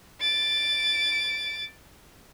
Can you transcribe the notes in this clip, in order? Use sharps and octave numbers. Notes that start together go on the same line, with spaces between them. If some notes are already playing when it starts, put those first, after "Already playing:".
A6 D7